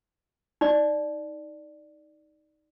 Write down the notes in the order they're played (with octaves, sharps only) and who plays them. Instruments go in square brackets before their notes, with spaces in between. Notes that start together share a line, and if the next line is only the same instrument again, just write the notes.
[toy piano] D#4 D5